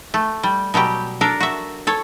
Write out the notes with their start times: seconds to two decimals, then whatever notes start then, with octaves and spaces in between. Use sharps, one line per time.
0.14 A3
0.43 G3
0.74 B2 F#3 G3 G4
1.21 D4 A4 A#4
1.40 F#4 E5
1.87 A4 C#5